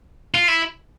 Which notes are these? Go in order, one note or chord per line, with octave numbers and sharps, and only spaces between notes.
F4
E4